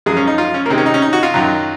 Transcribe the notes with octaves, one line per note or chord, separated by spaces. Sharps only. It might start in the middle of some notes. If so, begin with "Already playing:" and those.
F#2 F3 G#3 G#4
C#4
D#4
F4
C#4
A#3
C3 D#3 G#3 C4
C#4
D#4
C#4
D#4
F#4
F4
F#2 D#3 F#3